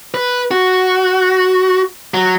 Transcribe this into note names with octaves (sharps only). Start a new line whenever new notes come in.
B4
F#4
F#3